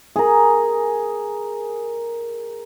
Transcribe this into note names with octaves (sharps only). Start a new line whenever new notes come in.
G#4 A#4